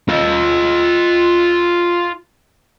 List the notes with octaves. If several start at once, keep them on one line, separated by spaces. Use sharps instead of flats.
F4 D#5